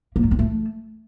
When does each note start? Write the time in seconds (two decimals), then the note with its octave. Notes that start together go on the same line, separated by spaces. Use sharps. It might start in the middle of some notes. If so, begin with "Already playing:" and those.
0.16 A#3
0.23 F#3
0.31 C4
0.39 A3